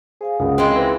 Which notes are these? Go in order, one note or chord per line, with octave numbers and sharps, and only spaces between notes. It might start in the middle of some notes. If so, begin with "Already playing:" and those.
G#4 C5 F5 G#5
C#2 F#2 G#4 F#5 D#6
G#3 C4 G#4 C5 G5
E3